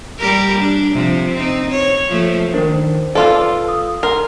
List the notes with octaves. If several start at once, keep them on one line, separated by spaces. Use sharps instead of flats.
G3 G4 A#4
D4
C3 F3
C4 D#4
C#5
F3 A3
D#3 D4 A#4 C5
F4 A4 B4 D5 F5 C6
D#6 E6
A#4 C6